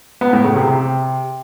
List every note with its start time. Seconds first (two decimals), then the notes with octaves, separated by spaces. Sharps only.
0.21 B3
0.33 A2
0.44 C#3
0.56 C3
0.67 C3